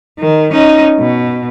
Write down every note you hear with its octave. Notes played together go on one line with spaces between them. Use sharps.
D#3
C#4 D#4
B2